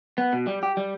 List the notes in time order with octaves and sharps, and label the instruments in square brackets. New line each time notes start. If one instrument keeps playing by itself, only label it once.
[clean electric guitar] B3
B2
G3
G4
G3